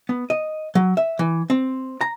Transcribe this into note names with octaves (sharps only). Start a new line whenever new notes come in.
B3
D#5
F#3
E5
E3
C4
A#5